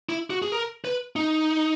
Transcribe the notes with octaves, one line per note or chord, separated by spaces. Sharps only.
E4
F#4
G#4
A#4
B4
D#4